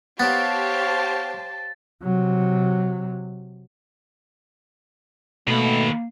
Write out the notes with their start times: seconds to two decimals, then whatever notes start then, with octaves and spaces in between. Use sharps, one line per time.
0.20 B3 G4 C5 C#5 F5 A5 A6
2.03 C3 F#3
5.48 B2 D#3 A3 A#3 B5